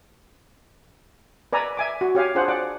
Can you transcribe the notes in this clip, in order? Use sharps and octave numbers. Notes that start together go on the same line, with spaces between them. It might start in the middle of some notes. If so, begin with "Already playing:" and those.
B4 D5 G#5 A#5 E6
E5 G#5 D6
F#4
G4 C#5 F5 G#5
D4 F4 G#4 C5 F#5
D5 F#5 D6